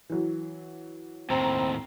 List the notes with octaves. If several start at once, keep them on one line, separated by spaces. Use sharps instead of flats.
E3 F#3
D#2 A2 C4 A#5